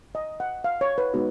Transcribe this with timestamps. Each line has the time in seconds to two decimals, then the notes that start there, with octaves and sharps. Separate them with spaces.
0.15 D#5
0.40 F#5
0.64 F5
0.81 C#5
0.98 B4
1.14 G#3 B3 D#4 F#4